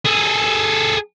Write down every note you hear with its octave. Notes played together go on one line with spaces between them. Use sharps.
G#4 A4